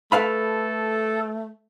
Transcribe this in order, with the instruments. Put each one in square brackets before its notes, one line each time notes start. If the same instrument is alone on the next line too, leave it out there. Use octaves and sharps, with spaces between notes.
[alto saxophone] A3 [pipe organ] A4 [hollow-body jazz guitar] B4 F5 B5